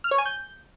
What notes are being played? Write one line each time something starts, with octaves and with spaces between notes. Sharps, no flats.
F6
C#5
G#5
G6